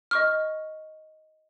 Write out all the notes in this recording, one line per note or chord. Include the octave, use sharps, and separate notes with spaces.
D#5 C#6 F6